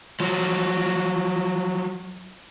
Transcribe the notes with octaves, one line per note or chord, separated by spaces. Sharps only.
F3 F#3